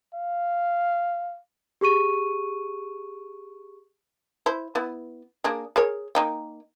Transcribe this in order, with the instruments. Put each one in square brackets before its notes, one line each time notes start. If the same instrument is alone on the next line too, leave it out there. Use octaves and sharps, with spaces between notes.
[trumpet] F5
[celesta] G4 G#4 C#6 D#7
[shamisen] E4 C5
B3 E4
A#3 D4 G#4
G#4 A#4 C#5
A#3 D#4 G5